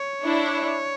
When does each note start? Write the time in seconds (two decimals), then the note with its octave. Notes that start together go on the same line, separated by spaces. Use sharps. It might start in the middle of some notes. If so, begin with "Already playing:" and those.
Already playing: C#5
0.24 D4 E4